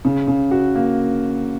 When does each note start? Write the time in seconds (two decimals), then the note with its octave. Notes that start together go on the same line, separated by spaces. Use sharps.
0.05 C#3
0.27 C#3
0.51 F#4
0.75 A#3